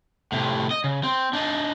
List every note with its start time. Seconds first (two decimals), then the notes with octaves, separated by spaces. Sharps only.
0.32 A2 C3
0.71 D#5
0.84 C#3
1.04 C4
1.33 D4 D#4